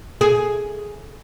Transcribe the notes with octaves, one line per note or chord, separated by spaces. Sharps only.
G#4